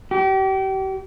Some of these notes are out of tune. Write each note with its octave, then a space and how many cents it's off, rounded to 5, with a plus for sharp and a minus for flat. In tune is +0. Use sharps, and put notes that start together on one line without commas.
G4 -35